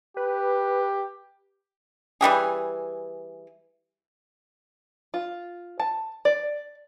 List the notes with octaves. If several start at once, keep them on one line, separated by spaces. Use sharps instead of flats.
G4 B4
E3 G3 G4 G#4
F4
A5
D5